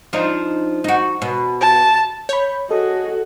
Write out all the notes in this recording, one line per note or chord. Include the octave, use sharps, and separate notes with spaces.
F3 D4 D#4
D#4 F#4
B2
A5
C#5 B5 G6
F#4 G#4 A4 D#5